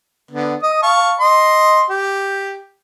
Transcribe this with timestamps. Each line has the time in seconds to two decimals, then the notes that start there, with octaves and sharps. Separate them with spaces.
0.31 D3 B3
0.63 D#5 D#6
0.83 F5 A5 C#6
1.20 D#5 C6
1.90 G4